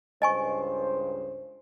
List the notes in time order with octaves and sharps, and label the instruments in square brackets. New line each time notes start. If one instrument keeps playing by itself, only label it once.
[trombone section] C#2 G2 C5 [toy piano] D#5 G#5 C#6